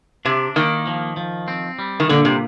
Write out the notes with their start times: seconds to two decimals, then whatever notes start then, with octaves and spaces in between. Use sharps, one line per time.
0.25 C3 D4
0.56 D#3 A#3
0.87 F3
1.17 F3
1.48 C4
1.79 G3
2.00 D#3
2.09 A#2 D3
2.25 C3